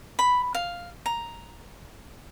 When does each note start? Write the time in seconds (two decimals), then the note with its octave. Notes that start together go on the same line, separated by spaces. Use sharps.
0.19 B5
0.55 F5
1.06 A#5